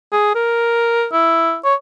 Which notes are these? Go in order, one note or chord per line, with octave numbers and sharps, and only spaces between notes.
G#4
A#4
E4
C#5